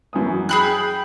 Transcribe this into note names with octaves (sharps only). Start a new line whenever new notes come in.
F#2 E3 D#6
G#4 G5 B5 F#6